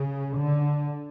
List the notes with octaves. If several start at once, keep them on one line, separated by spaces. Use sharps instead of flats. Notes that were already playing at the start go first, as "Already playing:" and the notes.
Already playing: C#3
D3